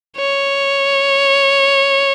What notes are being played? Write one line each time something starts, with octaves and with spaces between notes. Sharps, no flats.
C#5